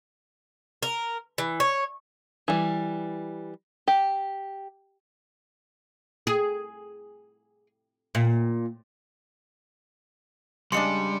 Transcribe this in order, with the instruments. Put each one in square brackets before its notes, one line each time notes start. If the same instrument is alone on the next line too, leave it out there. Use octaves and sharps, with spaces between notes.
[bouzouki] A#4
E3
C#5
[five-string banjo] E3 G3
G4
[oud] G#4
A#2
[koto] C#3 G#3 D4 [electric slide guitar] G3 [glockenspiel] C6 C#7